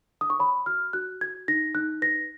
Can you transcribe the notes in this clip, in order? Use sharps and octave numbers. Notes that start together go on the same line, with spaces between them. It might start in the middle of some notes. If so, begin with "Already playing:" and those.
D#6
C#6
C#5 B5
F#4 F6
F#4 F#6
F#4 G#6
D#4 A#6
D#4 F#6
B4 A#6